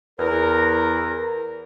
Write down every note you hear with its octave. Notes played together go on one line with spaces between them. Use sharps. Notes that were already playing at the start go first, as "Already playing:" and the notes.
E2 A#4